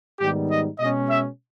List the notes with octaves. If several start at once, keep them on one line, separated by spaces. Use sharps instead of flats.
G#2 D#3 G3 B3 D#4 G4
D#5
B2 G#3 C#4 D#5
E5